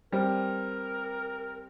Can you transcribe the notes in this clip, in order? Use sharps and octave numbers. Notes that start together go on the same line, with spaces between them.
G3 C4 A#4